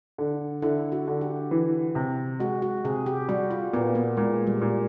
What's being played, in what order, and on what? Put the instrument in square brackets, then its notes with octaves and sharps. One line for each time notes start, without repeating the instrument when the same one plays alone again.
[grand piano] D3
[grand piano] D3 [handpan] E4
[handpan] F#4
[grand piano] D3
[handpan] G4
[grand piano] E3
C3
[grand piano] G#3 [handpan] F#4
[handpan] F#4
[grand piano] C3 [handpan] G#4
[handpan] G4
[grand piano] G3 [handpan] F#4
[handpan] F4
[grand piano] A#2 [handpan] B3
[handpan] A#3
[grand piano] A#2 [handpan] G#3
[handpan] G3
[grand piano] A#2